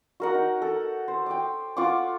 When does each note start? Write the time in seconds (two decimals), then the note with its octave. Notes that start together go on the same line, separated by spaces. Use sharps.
0.20 F#4 A#4 F#5
0.35 D#4
0.62 A4
1.08 C5
1.26 G5 D6
1.77 F4 F#5 C#6 D6